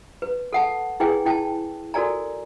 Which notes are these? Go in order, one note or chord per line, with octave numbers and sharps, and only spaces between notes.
B4
A4 F#5 A5
E4 G#4 B4 G5 G#5
E4 G5 A5
F#4 A4 A#4 D5 G#5 A#5